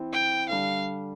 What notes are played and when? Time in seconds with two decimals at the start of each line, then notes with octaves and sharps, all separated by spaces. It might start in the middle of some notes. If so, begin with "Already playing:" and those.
Already playing: E3 C4
0.13 G5
0.49 D3 G3 D4 F5